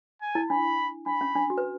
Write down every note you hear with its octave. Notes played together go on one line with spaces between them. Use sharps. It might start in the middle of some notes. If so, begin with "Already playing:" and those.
G#5
E4
D4 B5
D4 B5
C#4
D4
F#4
B4